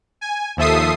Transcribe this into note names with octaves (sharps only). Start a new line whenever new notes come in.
G#5
D#2 F3 A4 E5 D#6 C7